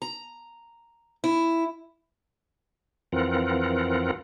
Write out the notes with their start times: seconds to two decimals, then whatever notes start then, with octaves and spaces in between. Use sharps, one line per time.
0.02 A#5
1.24 E4
3.12 F2 E3 C4 F4 A#4 F#5